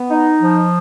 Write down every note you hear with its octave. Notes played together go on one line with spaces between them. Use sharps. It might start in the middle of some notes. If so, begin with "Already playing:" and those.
Already playing: B3
D#4
F3